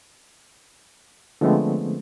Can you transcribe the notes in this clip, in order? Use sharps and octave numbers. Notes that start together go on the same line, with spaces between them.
D3 F3 G#3 A3 B3 C4